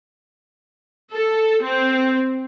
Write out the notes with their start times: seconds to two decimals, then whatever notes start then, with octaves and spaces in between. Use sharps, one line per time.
1.12 A4
1.62 C4